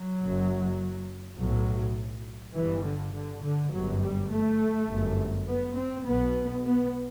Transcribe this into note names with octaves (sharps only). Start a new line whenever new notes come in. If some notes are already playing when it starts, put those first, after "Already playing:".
Already playing: F#3
F#1 F#2
B1 A2 F#3
G1 G2 E3
D3
D3
D3
G1 F#2 F#3
G3
A3
G1 F#2
B3
C4
B1 B2 B3
B3